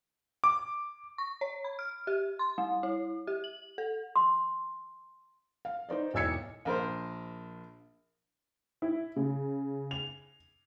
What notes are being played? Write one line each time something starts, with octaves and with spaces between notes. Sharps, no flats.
D6
C#6
C#5
B5
F6
G4
C6
G3
E4
G4
F#7
A4
C6
F5
D#4 C5 D5 D#5
E1 B1 E3 E6 G#6 C#7
A#1 A#4 C5
E4
C#3
F7